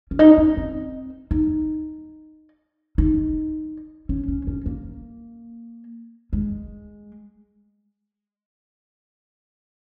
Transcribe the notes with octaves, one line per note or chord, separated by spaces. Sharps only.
C#4
D#4
C#4
C4
D#4
D#4
C#4
C#4
C#4
A#3
G#3